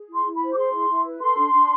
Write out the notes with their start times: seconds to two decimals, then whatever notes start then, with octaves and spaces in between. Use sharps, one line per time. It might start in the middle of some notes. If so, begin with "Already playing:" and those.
Already playing: G#4
0.08 E4 C6
0.25 E4
0.36 B5
0.41 C5
0.52 D6
0.56 G#4 C6
0.73 E4
0.89 E4
1.05 B4
1.21 A4 C6
1.37 D4
1.53 D4